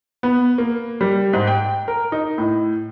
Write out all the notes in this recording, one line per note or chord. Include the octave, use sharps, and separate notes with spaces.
B3
A#3
G3
G#2
G5
A#4
D#4
A2